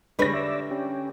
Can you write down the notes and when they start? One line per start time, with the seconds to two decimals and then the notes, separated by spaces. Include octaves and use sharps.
0.19 D3 G3 G#3 B4 C#5 A#6
0.34 D5 E5
0.71 C#4 G4